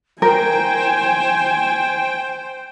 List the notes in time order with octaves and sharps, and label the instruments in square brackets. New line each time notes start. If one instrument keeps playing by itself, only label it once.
[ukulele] A#4 [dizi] C5 [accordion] G5 [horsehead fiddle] G#5